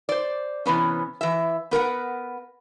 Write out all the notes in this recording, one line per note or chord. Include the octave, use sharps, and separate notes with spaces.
C5 D5
C3 E3 B3 C#4
E3 E5
B3 A#4 B4 F#5